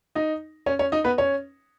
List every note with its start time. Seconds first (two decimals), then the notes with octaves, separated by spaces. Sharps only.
0.15 D#4 D#5
0.66 C#4 C#5
0.79 C#4 C#5
0.92 D#4 D#5
1.04 B3 B4
1.18 C#4 C#5